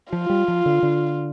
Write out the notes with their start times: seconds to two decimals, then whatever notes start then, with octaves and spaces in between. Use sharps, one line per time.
0.12 F3 F4
0.30 G3
0.48 F3
0.66 D3
0.83 D3